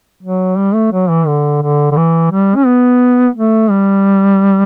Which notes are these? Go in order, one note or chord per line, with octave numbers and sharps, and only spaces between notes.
F#3
G3
A3
F#3
E3
D3
D3
D3
E3
G3
C#4
B3
A3
G3